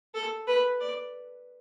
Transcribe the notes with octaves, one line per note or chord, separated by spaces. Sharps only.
A4
B4
D5